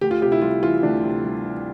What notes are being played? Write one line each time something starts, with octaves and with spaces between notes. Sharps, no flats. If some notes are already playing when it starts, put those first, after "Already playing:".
D2 G4
F4
C3 G4
E4
G3 F4
E3 F4
D2 D4
C3
G3
E3